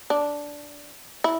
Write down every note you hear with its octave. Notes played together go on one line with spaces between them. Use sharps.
D4
E4